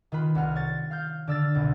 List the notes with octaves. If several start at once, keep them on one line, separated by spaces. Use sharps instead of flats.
D#3 F4 B4 B5
C2 F#5 F6
C#5 A6
F5 F6 G6
D3 D5 E6 F6 A6
G1 C2 B2